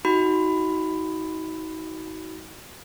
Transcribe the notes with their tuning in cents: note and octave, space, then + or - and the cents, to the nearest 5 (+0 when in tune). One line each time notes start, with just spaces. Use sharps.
D#4 +35 F#4 +10 B5 +10